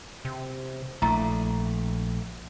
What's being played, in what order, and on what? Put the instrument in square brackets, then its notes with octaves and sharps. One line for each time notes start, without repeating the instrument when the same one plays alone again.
[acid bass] C3
[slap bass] A#1 [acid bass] A3 [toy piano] E4 A#5